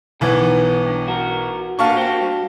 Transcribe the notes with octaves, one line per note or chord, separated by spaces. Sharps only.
B1 D#3 E3 B3
G2
F#4 A#4
D3 A#3 B3 F5 A5 C#6
F#4 G4 C5
G2